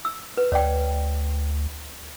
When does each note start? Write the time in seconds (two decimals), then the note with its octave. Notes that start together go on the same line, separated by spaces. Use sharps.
0.05 E6
0.37 B4
0.52 D2 C#5 D5 G5